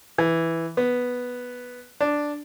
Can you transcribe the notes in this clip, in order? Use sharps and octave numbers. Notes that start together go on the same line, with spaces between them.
E3
B3
D4